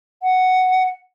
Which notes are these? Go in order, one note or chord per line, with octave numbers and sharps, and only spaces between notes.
F#5